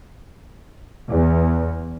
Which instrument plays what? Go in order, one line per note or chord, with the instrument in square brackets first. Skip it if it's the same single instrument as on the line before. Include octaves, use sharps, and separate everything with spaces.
[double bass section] E2